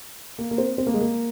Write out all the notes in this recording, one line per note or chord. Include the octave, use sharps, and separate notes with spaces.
A#3
A#3
C4
C4
A#3
G#3
A#3